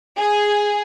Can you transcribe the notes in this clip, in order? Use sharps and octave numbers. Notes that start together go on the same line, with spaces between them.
G#4